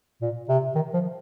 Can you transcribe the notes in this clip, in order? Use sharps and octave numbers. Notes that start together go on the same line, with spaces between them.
A#2
C3
D#3
F3